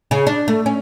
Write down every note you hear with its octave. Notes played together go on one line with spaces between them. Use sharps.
C#3
D4
A3
C#4